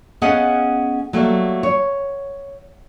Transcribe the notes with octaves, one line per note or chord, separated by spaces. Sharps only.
B3 C#4 G#4 D#5 F5 F#5
F#3 G3 A3 A#3
C#5